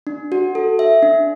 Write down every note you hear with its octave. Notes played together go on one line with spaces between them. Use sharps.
D4
F#4
A4
E5
D4